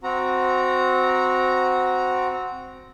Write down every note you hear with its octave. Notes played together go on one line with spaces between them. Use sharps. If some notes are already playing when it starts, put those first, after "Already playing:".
C4 F#4 A#5